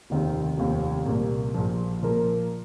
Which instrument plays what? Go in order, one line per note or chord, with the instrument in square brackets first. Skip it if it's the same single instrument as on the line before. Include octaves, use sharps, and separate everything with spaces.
[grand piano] F1 D#2 D#3 C4
F1 D#2 D#3 C4
C2 A#2 A#3
A#1 A#2 F3
A#2 F3 A#3 F4 A#4